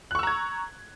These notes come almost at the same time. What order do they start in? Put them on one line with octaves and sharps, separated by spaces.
F#6 C#6 E6 A#5 G#6